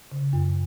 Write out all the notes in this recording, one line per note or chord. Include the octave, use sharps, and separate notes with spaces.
C#3
F#2